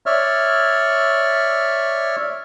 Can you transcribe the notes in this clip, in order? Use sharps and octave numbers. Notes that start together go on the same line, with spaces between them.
C#5 D5 E5 F6